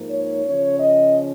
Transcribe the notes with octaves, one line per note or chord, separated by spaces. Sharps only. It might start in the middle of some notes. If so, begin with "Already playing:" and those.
Already playing: G#2 F3 A#3 D#4
C#5
C#3 F3 C#4 C#5
D#5